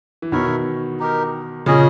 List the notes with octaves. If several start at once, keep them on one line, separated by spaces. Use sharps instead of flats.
E3
B2 D#3 E4 A#4 C#5 E5
D#4 G4 A#4
A#2 C#3 C#4 G#4 D#5